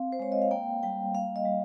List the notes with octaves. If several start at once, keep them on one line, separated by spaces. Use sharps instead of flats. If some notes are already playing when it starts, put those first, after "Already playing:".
Already playing: C4 F5
C5
G#3 C#5
D#5
F5
A#3 G5
G3 G5
A#3 F5
D#5
G3